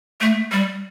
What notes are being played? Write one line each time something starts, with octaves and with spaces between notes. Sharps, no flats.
A3
G3